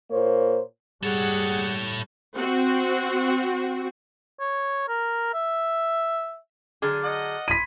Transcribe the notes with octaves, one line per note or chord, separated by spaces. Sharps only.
A#2 A#3 C5 C#5
G3 G#4 A4 C#5 F#5
C4 F#4
C#5
A#4
E5
D3 F#3 G#4 D6 F6 A6
D#5 F#5
B5 C6 G#6 B6 D#7